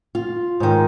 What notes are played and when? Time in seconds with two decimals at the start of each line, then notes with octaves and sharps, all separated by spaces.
0.15 F4
0.60 G#2 D#3